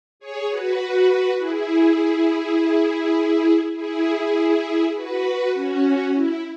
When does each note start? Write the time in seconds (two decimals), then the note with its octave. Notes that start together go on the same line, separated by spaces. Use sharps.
0.20 G#4 C#5
0.49 F#4 B4
1.38 E4 G#4
3.76 E4 G#4
4.94 F#4 B4
5.54 C#4 F#4
6.13 E4